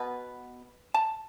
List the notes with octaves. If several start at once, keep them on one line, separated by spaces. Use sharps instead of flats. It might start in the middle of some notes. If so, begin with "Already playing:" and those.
Already playing: B2 B3 B4
A5